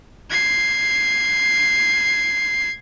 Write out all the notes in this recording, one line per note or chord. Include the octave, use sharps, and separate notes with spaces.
G#6 C7